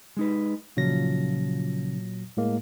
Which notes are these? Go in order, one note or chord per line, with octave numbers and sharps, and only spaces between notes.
G#3 D#4 B4
A#2 C#3 F3 F#3 A#6
A2 G#3 A#3